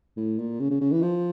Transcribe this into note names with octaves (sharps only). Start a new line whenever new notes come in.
A2
A#2
C#3
C#3
C#3
E3
F3